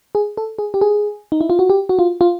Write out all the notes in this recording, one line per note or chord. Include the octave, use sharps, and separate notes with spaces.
G#4
A4
G#4
G4
G#4
D#4
E4
F4
F#4
G4
F#4
F4
F4